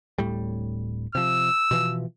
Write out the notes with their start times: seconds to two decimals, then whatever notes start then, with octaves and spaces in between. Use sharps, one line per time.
0.18 D1 A2 G3
1.15 C3 F3 E6
1.71 B2 E3 F3